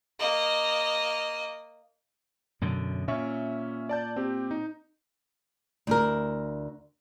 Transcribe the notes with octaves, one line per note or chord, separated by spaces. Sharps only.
A#3 D#5
F#2 B2 D3
A#2 C#4 E5 C#6
D5 A5 G6
C4 G4
D#4
D2 E4 A#4